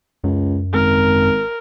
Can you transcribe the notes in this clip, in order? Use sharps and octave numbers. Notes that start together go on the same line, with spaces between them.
C#2 F#2
G#1 A#4